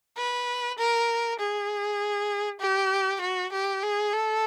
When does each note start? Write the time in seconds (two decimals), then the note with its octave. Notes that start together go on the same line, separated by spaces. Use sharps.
0.17 B4
0.78 A#4
1.39 G#4
2.60 G4
3.21 F#4
3.52 G4
3.83 G#4
4.13 A4